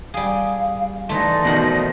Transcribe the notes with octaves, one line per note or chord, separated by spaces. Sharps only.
G3 G#4 F5
E3 A3 D#4 D5 C6
B2 D#3 C5 F#5